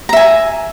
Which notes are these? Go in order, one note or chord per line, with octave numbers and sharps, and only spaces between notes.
E5 G#5 A#5